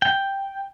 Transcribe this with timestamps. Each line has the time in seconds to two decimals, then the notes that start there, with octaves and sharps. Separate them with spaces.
0.02 G5